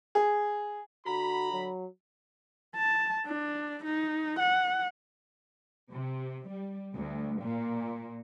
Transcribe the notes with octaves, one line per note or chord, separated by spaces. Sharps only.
G#4
D3 F#4 A#5 B5
F#3
A5
D4
D#4
F#5
C3
G3
D2
A#2